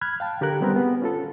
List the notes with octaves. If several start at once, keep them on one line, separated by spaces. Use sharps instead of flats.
B5 F6 F#6 G#6
F5 G5 A5
D3 G4 A4 A#4 F#6
D#3 G3 B3 C4 G4 A#4
B3 G#4
C#4 F4 A4